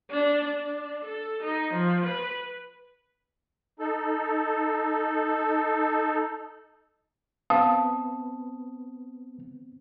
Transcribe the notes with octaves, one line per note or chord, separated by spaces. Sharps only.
D4
D4
A4
D#4
F3
B4
D#4 A4
B3 C4 B4 F5 A5 D#6